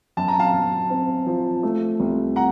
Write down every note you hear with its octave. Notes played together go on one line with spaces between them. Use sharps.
F#2 A5
A#5
F5 A5
F#2
C4
F3
A3
C2
F#5 A#5